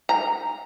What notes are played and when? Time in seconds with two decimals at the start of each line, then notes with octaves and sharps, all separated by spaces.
0.09 A#5